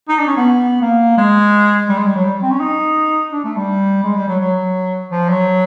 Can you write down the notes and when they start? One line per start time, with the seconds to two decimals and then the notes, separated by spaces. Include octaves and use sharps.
0.09 D#4
0.19 D4
0.27 C#4
0.37 B3
0.81 A#3
1.17 G#3
1.89 G3
1.97 G#3
2.07 G3
2.16 F#3
2.24 G3
2.42 C4
2.51 C#4
2.60 D#4
3.32 D4
3.44 A3
3.56 G3
4.03 G#3
4.16 G3
4.28 F#3
4.40 F#3
5.11 F3
5.29 F#3